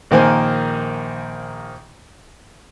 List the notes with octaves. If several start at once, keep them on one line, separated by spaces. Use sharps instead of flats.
A#1 D#3 A#3 C5 G#5